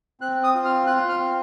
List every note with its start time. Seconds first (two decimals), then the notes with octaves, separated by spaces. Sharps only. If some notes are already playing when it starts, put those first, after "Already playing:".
0.21 C4 F#6
0.44 D#6
0.55 F4
0.65 F6
0.87 F4 F#6
1.09 F6
1.20 C4